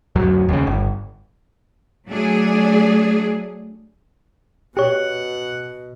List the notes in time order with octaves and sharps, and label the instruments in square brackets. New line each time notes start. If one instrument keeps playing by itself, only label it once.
[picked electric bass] D1 F#2 F#3
D#2 C#3
G1
[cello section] F#3 A3 D4 G#4
[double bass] B2 [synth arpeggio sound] G4 C#5 [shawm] F#5